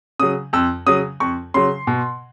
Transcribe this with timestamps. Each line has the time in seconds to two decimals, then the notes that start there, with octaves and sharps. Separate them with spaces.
0.19 C#3 F#3 D#6
0.53 F2 E6
0.86 C#3 F#3 D#6
1.20 F2 C#6
1.54 C#3 F#3 C6
1.87 B2